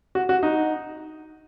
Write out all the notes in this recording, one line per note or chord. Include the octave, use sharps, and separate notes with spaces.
F#4
F#4
D#4